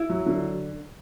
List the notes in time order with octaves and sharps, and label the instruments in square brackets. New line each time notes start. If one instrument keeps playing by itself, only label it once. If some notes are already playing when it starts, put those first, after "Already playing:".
Already playing: [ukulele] E4
[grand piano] F#3
D3